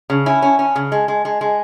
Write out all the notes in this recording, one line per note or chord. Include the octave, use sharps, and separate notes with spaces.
C#3
C#4 E4
C#4
C#4
C#3
G#3
G#3
G#3
G#3